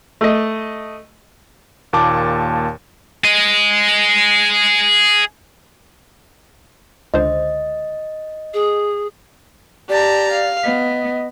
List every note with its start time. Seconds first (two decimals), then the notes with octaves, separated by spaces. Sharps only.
0.21 A3 D#5
1.93 D#2 A#2 A5 D6
3.24 G#4 D#5
7.14 C#2 D3 C5 D#5
8.53 G#4
9.89 G4 D5 A5 A#5
10.31 F5
10.64 B3 D#5